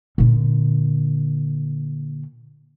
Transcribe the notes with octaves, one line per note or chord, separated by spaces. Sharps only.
A#2 D3